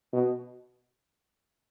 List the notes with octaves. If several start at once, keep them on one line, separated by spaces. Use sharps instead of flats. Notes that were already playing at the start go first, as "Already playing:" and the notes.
B2